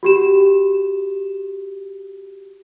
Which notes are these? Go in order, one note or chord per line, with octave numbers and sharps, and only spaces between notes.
F#4 G4 E7